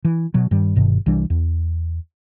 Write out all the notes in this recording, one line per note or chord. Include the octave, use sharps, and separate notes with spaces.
E3
B2 F#3
G2 D#3 G3
G1 G2 B2 D#3
C2 E3 G3 D4
E2